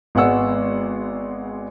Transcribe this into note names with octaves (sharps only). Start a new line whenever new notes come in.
G#1 G#3 B3 F#5 E6